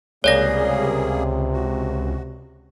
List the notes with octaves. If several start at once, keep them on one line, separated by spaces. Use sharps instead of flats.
C#2 C3 G3 A#3 G#4 C#5 D5 A#6
F#4